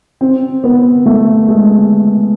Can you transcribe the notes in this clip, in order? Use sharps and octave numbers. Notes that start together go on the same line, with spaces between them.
C4
B3
A3
G#3